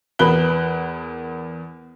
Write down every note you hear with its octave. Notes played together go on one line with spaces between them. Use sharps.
E2 B3 A#4 B5 F#6 G7